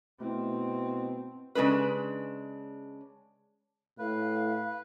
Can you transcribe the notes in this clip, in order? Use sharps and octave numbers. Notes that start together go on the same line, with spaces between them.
B2 A3 C4 E4
C#3 G#3 D4 B4
A2 B4 F5